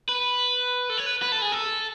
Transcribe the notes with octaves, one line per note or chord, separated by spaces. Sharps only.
B4
A4
C#5
B4
B4
A4
G#4
A4